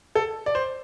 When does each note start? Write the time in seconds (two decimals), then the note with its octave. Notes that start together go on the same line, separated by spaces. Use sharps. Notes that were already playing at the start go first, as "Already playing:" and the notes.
0.15 A4
0.46 D5
0.55 C5